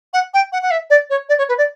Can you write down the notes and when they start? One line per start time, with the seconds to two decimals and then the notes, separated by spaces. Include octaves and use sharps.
0.13 F#5
0.34 G5
0.52 F#5
0.62 F#5
0.71 E5
0.90 D5
1.10 C#5
1.29 D5
1.38 C#5
1.48 B4
1.58 D5